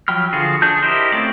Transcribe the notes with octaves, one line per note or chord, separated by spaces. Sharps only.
F3 F#3 G5 B5 F6
D3 F3 F4 F#4 G#4
D4 G#4 A5 G6
E4 G4 A#4 C5 D#5
A3 C4 C#4 F4 D5